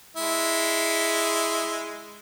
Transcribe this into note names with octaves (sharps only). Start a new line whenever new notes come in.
G#3 E4